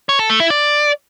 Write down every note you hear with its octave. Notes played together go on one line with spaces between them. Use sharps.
C#5
A4
A3
E4
D5